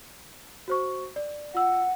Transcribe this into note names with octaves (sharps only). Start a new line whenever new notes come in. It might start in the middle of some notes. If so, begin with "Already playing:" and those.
F#4 C5 C#6
D5
F4 F#5 E6